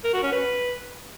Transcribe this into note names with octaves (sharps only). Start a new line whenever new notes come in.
A#4
F#4
C#4
B4